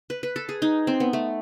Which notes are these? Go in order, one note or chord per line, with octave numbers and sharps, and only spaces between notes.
B4
B4
A4
G#4
D#4
C4
B3
A3